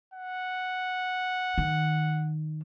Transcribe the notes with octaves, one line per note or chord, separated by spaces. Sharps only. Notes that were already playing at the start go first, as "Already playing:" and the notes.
F#5
D#3